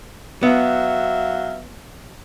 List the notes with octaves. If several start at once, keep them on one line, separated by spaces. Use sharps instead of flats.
F#3 B3 E5 F5